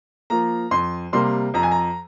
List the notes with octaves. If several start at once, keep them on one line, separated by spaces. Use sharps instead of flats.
F3 A#3 A#5
F2 C6
C3 G3 A#3 C6
F2 A#5
G#5
A#5